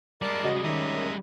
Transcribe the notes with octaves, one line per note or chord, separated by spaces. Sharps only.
G3 G#3 A#4 D5 A5 D6
C#3 F#4 D#5
D#3 C#4 E5 A#5 D#6